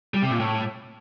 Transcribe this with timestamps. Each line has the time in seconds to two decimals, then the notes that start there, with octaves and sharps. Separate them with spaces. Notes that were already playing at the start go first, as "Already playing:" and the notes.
0.14 G3
0.22 C3
0.31 A#2
0.40 A2